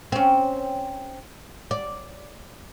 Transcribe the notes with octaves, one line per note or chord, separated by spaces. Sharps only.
C4 C#4
D5